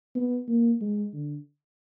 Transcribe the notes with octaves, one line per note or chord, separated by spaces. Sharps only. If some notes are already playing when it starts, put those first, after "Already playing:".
B3
A#3
G#3
D3